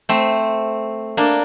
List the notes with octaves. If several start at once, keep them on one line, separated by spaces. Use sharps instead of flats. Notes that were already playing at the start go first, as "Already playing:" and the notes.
A3 C4
A#3 D4